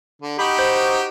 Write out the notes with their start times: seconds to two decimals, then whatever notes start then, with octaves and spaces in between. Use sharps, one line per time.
0.22 D3
0.39 D#4 F#4 G4 B5
0.59 C5